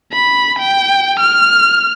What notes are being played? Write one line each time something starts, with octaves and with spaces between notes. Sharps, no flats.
B5
G5
F6